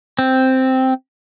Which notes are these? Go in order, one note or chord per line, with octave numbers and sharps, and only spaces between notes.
C4